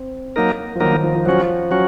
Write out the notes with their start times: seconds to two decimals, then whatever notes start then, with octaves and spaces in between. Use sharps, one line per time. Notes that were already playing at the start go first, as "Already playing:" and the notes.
Already playing: C4
0.36 F#3 A#3 D#4 A#4
0.75 F3
0.80 D#3 F#3 A#3 D#4 A#4
0.92 D#3
1.03 F3
1.15 F3
1.25 F3 F#3 C#4 F#4
1.71 F#3 C#4 F#4